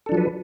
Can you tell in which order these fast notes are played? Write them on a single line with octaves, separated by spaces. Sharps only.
A4 D4 F3 F#3 B4